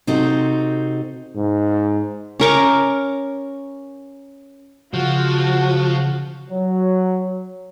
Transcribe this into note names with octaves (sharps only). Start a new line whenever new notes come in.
C3 C4 D#4 F#4 G4 A4
G#2
C#4 A#4 C#6 D6
C#3 F3 F#4
F#3